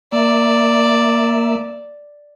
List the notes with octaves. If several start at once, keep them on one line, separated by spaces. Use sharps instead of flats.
A#3 D5 E5